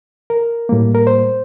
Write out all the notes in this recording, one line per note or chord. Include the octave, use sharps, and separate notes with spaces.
A#4
A2 G3 A#3
A#4
C5